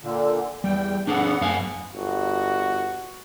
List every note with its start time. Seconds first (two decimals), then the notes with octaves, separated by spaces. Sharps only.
0.03 A#2 D3
0.64 E2 G3 G5
1.07 B3 D4 G#4 A4 F#5
1.41 F#2 F5 G#5
1.95 G1 F#4